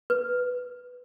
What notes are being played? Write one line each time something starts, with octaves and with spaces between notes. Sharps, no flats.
B4